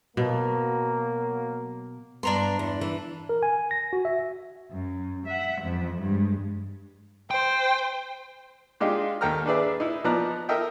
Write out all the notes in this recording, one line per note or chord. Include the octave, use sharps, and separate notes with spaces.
B2 F#3 A#3
G2 B3 D4 A#5 C6
E2
E3
A#4
G#5
A#6
F#4
E5
F#2
E5 F#5
F2 E3
G2 G#3
C5 G5
G#3 D4 D#4 F4 G4
D#2 A4 G5 A#5 F6
D4 G#4 B4 D5 E5
D#4 E4
F3 B3 D#4 D5 A#5 F#6
A4 A#4 D#5 E5 G5